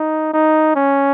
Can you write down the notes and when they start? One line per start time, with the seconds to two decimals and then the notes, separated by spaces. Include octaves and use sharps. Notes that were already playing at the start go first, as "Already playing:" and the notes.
Already playing: D#4
0.34 D#4
0.76 C#4